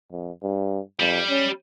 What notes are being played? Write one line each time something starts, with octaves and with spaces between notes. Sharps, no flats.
F2
G2
F2 G3
C#4